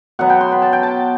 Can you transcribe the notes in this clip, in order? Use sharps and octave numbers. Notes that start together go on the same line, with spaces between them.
B2 F#3 B3 F#5
G5
C6
B5
A5
G5
A5